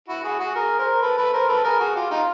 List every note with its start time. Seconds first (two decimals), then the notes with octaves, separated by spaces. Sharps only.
0.08 E4 F#4
0.24 F#4 G#4
0.39 F#4 G#4
0.55 G#4 A#4
0.78 A#4 C5
1.02 A4 B4
1.17 A4 B4
1.33 A#4 C5
1.48 A4 B4
1.64 G#4 A#4
1.80 F#4 G#4
1.96 F4 G4
2.11 D#4 F4